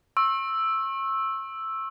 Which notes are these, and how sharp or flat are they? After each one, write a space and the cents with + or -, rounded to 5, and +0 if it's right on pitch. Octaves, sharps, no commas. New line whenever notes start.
C#6 -40 E6 +0